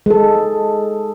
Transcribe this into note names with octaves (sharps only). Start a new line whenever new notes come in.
G#3 A4